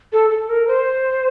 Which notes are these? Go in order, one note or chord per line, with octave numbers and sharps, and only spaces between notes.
A4
A4
A#4
C5